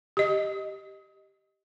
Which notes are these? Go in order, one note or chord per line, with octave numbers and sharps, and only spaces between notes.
G4 D#5